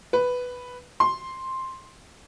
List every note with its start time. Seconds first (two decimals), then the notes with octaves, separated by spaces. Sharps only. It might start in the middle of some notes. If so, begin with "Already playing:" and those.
0.13 B4
1.00 C6